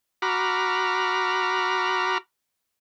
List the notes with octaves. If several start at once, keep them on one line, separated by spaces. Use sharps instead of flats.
F#4 A#5 B5 D6 F6